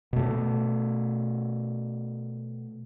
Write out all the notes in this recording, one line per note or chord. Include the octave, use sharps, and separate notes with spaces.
B2 A3